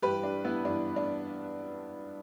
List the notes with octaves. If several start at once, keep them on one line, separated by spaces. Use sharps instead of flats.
G2 E3 G4 B4
D4
B3 E4
G2 E3 D4
D4